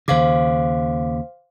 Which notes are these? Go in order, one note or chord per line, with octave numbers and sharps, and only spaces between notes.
D#2 C#3 C5 F5 D6